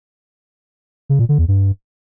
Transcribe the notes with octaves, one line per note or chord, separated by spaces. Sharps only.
C#3
A#2
D3
E2
G2